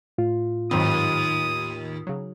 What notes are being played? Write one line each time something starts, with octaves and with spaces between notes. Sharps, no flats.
A2 F4
D#2 G#2 F#3 C4 D#6
C#3 F#3